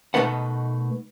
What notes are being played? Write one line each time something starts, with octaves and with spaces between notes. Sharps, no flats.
B2 G#3 A3 D#4 B4 F#5